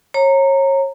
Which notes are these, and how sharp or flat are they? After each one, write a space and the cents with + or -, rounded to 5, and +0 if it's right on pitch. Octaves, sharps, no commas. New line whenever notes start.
C#5 -25 A#5 -15